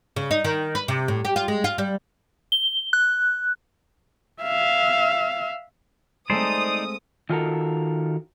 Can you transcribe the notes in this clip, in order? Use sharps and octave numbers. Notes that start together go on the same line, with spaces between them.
C#3
D#4
D#3
B4
C3
A2
G4
F4
G#3
F4
G3
G7
F#6
E5 F5
G#3 A3 C4 D#4 C5 D5 D#6
D#3 F4 F#4 A4 A#4